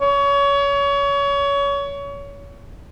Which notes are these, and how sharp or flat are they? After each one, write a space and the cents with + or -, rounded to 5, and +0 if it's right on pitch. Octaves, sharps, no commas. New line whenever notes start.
C#5 +25